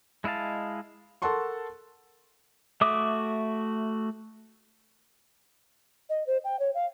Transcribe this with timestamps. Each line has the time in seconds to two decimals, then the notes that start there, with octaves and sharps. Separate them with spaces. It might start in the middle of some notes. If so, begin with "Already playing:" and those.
0.24 G#3 E4 D#5 F5 A5
1.22 A4 A#4 F#5 A5 C6 C#6
2.81 A3 F#4 E5 D6 D#6
6.09 D#5
6.27 C5
6.44 G5
6.59 C#5
6.74 F5